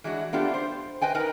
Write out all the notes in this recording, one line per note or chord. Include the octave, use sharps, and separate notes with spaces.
E3 G#3 D4 F#4
A3 B3 D4 F4 G4
C5
B4 D#5 G5 G#5
D#4 A#4 B4 D#5